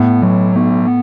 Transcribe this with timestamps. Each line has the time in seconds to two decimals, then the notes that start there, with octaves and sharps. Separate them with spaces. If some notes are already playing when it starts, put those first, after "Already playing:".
Already playing: A2 B3
0.22 F#3
0.56 B3